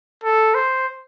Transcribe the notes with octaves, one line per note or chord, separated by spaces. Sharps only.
A4
C5